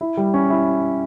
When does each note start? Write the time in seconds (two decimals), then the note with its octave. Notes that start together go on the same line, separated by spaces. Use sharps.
0.01 E4
0.17 G3
0.34 C#4
0.50 E4